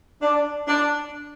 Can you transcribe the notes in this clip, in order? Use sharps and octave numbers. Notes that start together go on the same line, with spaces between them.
D4
D4